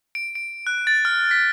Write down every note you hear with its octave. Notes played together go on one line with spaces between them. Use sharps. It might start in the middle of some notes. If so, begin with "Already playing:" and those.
D7
D7
F#6
A6
F6
B6